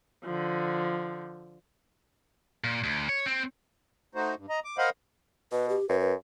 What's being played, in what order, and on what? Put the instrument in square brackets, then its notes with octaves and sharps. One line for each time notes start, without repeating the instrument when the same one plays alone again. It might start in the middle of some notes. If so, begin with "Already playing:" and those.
[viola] D3 F3
[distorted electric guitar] A#2
D2
C#5
C4
[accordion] A3 D#4 F#4 C5
G2
D#5 A#5
D6
A#4 C5 D#5 F5 F#5 B5
[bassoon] B2 [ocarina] B4
[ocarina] G4
[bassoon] F#2 [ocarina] B4
[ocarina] B4